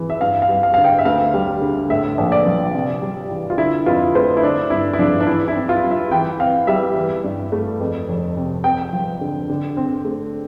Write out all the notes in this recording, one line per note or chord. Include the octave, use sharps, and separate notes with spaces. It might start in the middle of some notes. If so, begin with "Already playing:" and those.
Already playing: E3
E5
G2 F5
F5
G3
F5
D3 F5
G5
E5
D2 F5
G3
D3
A2 E5
A#1
D5
F3
C3
G3
E3
F4
D3 E4
F2 F4
A3 C5
E4
D3 D4
G2 E4
E4
F3 D4
D4
E3 E4
E4
C4
F4
G3
E5
E3 G5
C4 F5
G3 E5
E3
G2
A3
F2
F1
C3
F2 G5
F3
D3
D3
C4
A3